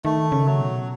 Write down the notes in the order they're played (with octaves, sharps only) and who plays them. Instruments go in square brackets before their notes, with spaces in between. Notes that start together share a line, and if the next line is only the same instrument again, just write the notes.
[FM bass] D#3 [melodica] A3
[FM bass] C#3
[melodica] F#3
[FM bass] B2